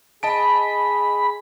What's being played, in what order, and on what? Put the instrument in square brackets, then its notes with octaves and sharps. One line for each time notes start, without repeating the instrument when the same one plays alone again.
[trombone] G#4 [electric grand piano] D#5 A5 D7 [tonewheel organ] B5